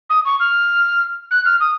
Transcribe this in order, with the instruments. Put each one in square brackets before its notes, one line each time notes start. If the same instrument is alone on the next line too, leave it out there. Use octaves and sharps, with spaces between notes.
[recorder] D#6
C#6
F6
F#6
F6
D#6